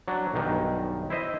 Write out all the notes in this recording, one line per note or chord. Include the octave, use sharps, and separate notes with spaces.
F#3 D4
B1 G2 D#3
E4 C5 D#5 E5